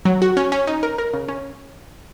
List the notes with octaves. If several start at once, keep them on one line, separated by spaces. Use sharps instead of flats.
F#3
F#4
C#4
C#4
D#4
A#4
A#4
C#3
C#4